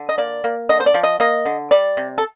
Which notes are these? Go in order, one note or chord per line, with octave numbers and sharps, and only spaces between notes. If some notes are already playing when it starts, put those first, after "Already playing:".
Already playing: D3
D#5
A#3 D5
A#3
D3 D#5
C5
D5
F3
D#5
A#3 D#5
D3
G3 D5
C3
A4